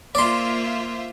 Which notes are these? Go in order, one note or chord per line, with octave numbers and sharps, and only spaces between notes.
A#3 F4 C5 D5 E5 C6